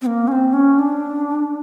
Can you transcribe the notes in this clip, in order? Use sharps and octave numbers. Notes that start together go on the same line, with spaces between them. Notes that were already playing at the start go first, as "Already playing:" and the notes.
C4
A#3
C#4
C4
C#4
D4